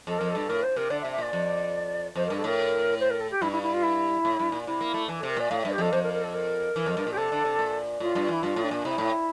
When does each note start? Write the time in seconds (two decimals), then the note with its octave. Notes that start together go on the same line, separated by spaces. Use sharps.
0.07 F2 A4
0.19 F2 A#4
0.30 G2 A4
0.49 A2 A#4
0.63 C5
0.76 C3 A#4
0.90 D3 D5
1.01 E5
1.05 C3
1.12 E5
1.18 A#2 D5
1.33 F2
2.16 F2 C5
2.26 G2 A#4
2.37 A4
2.44 A2 A#4
3.00 C5
3.10 A#4
3.21 A4
3.31 G4
3.42 G2 E4
3.52 E4
3.62 E4
3.73 F4
3.83 E4
4.25 A2
4.40 G2
4.52 A#2
4.67 C3 E4
4.81 A#3
4.94 A3
5.08 E3
5.19 C3 A4
5.30 A#4
5.36 A#2 D5
5.50 A2 F5
5.61 G2 E5
5.71 G4
5.78 F2 A4
5.92 F2 C5
6.03 A#4
6.13 A#4
6.23 A4
6.34 A#4
6.76 E3
6.86 F2
6.97 G2
7.07 A#2
7.12 G4
7.17 C3 A4
7.32 D3
7.45 C3
7.59 A#2
8.00 A2 F4
8.15 G2
8.28 E3 E4
8.42 G2 F4
8.56 A2
8.64 D4
8.71 A#2
8.85 C3 E4
8.98 A2